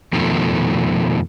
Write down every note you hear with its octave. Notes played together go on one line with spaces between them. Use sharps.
F2 B2 D#3 F3 A3